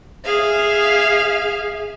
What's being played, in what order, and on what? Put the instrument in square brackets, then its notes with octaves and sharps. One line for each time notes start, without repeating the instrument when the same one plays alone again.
[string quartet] G#4 E5 F5